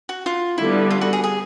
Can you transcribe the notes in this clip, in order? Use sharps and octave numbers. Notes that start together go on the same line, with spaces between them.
F#4
F4
D3 G3 B3 E4
F4
F#4
G#4
G#4